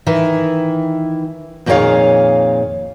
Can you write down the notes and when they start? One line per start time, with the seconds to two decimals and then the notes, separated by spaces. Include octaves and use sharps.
0.06 D#3 E3 E4
1.66 F2 A#2 D#3 G#4 C#5 F5